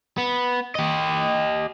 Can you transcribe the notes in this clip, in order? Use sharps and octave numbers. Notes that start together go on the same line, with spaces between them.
B3
G4 D#5